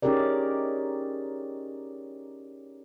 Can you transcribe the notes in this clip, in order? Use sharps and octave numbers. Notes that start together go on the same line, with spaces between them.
C#4 D#4 G4 G#4 A#4 D5